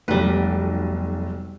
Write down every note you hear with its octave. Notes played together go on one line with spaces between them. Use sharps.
F1 B1 G3 B4